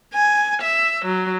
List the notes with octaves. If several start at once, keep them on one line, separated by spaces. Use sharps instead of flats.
G#5
E5
F#3